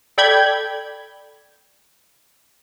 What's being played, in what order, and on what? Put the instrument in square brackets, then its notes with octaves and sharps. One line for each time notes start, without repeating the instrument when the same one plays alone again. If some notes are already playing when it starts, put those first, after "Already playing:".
[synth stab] A4 D5 G5 B5 G6 G#6